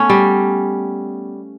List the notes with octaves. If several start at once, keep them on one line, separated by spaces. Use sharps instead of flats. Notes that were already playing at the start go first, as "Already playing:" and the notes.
Already playing: A3 B3 C#4
G3